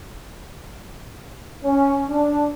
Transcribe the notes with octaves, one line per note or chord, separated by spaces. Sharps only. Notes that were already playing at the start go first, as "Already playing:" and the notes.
C#4
D4